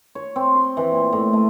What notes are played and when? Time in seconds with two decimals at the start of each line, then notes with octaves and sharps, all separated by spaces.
0.15 C#5
0.36 C4
0.55 C6
0.77 E3
0.92 A#2
1.12 A2
1.33 A3